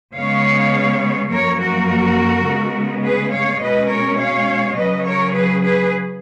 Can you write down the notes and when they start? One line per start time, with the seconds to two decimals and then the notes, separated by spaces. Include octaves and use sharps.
0.16 C#3 G#3 B3 C#5 F5
1.31 F#2 F3 A#3 A#4 C#5
1.60 F#4 A#4
2.47 C#3 G#3 B3
3.04 G#4 B4
3.33 C#5 F5
3.62 B2 G#3 C#4 B4 D#5
3.91 A#4 C#5
4.20 C#5 F5
4.78 C#3 F#3 C#4 B4 D#5
5.07 A#4 C#5
5.35 G#4 B4
5.64 G#4 B4